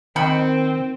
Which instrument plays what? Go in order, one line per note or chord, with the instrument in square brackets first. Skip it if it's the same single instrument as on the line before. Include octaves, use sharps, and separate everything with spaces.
[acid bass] D#3 [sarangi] C4 [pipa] F#5 G5 B5